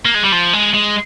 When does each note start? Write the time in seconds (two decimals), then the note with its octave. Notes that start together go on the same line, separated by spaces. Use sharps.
0.05 A#3
0.14 G#3
0.24 G3
0.32 F3
0.53 G#3
0.74 G#3